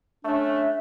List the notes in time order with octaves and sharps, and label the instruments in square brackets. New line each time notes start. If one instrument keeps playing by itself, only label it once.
[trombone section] A3 C#4 [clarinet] D4 [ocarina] E5